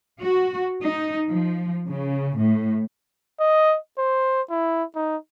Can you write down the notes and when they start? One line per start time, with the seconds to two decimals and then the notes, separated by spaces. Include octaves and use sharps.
0.19 F#4
0.82 D#4
1.28 F3
1.89 C#3
2.36 A2
3.40 D#5
3.98 C5
4.50 E4
4.96 D#4